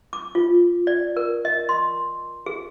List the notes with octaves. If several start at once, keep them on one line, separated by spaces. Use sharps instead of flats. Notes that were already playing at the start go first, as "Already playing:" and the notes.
D6
F4
D5
A#4
D#5
C6
G#4